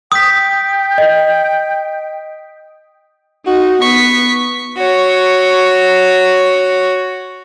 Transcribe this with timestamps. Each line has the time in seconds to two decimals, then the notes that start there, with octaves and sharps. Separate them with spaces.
0.12 G5 D#6 B6
0.98 D#5
3.46 D#4 F#4
3.81 B3 C#6 B6
4.77 F#4 C#5